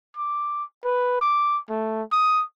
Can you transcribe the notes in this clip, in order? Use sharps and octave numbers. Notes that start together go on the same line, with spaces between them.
D6
B4
D6
A3
D#6